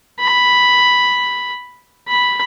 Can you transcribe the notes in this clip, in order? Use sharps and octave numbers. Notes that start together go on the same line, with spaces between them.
B5
B5